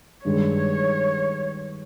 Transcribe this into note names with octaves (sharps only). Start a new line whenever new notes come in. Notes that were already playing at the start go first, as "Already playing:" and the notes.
G2 D#3 G#3 C#5